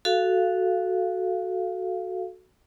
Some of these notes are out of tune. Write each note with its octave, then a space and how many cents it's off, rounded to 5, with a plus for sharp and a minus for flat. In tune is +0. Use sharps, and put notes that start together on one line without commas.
F#4 +0 A4 -10 F5 -10